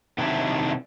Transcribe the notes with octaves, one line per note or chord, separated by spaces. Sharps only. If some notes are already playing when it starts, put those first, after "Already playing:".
C3 D#3 F#3 D4 E4 G4